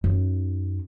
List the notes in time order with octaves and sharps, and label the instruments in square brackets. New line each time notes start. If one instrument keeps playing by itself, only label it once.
[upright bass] F#2 D#4